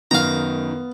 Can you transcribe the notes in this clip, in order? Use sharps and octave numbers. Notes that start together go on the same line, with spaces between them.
F#2 D#3 B3 F5 A#5